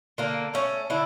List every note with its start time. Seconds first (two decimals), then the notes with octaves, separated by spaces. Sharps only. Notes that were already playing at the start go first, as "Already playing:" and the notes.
0.18 D3 A#3
0.54 A3 C#4
0.90 D3 E4